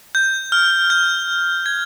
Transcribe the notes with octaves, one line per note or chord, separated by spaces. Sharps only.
G6
F6
G6
G#6